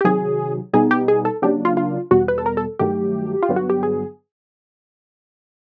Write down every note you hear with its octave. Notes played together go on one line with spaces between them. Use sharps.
G4
C3 D#3 F#3 G#4
B2 G3 B3 D#4 G#4
G4
G#4
A4
C#3 F#3 A#3 D4 G4
F4
F4
E2 B2 G3 F#4
B4
A4
A#4
A4
G2 D#3 F#3 A3 G4
F4
G2 D3 F#3 B3
F#4
G4
G#4